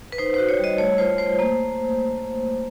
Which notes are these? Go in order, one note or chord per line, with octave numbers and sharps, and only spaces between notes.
B4
D#4 C5
F#4 C5
C#5
G3 D#5
A3 C#5
F4 C5
A3 C5
A#3